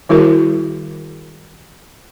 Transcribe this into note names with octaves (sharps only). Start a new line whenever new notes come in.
D#3 G3 E4 F#4 G#4 A#4